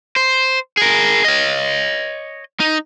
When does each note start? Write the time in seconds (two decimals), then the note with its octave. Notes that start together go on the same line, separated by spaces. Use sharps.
0.16 C5
0.77 G#4 A#4
1.25 C#5 D#5
2.60 D#4